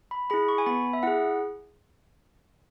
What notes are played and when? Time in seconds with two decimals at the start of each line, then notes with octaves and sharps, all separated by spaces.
0.11 B5
0.30 E4 G#4 B5
0.48 C#6
0.58 G#5
0.66 B3 B5
0.93 E5
1.03 E4 G#4 F#5